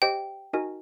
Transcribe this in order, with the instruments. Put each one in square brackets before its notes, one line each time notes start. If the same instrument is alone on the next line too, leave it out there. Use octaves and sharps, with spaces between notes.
[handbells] G4 C5 D#5 [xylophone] G5
[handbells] D#4 F#4 A#4 D#5 G#5